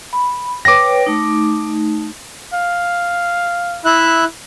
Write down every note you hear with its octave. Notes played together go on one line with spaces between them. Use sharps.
B5
B4 C#5 G5 D6 A#6
A3 D#4
F5
E4 E5 F#6